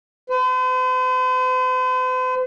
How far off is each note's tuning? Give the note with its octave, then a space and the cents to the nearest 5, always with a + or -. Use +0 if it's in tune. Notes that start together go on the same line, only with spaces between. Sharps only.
C5 -45